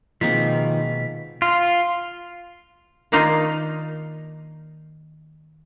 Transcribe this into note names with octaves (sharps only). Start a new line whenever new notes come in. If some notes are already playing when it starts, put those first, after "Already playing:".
B2 D#3 F3 G#3 A#3 C4 B6
F4
D#3 A#3 D4 D#4 F4